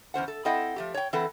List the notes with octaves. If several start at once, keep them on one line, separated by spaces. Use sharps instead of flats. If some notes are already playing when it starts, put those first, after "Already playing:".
E2 C#4 C5 F#5
A4
C4 E4 A4 D#5 F#5 G5
F3 A3 G4
C#5 G5
E3 C4 A4 B4 F#5